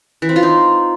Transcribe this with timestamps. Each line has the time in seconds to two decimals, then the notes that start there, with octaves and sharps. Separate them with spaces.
0.22 E3
0.29 C4
0.36 F4
0.43 D#4